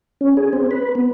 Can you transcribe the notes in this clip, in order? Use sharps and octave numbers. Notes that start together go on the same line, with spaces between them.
C#4
G#4
C4
B4
B3